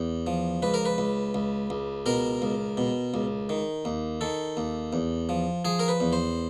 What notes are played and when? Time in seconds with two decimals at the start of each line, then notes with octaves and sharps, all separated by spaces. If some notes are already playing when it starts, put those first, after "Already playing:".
Already playing: E2
0.27 F3
0.62 C#2 B4
0.74 A#4
0.85 B4
0.98 C#2
1.34 C#2
1.70 C#2
2.06 B2 A#4
2.42 C#2
2.77 B2
3.14 C#2
3.49 D#3
3.85 D#2
4.21 D#3 A4
4.57 D#2
4.93 E2
5.29 F3
5.65 F3 G#4
5.79 A#4
5.88 B4
6.00 E2
6.13 C5